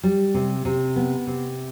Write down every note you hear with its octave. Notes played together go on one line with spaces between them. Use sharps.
G3
C3
C3
B3
C3